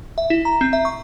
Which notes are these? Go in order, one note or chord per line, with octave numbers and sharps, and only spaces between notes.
E5
E4
A#5
C4
E5
C#6